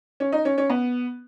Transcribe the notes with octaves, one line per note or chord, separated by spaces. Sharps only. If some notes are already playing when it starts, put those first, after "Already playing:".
C#4
D#4
C#4
C#4
B3